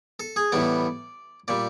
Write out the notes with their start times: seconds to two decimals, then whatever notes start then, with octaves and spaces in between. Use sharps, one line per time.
0.20 A4
0.36 G#4
0.52 A2 E3 G3 B3 D5
1.48 A#2 G3 D5